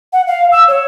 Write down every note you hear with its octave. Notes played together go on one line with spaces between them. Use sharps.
F#5
F5
E6
C#5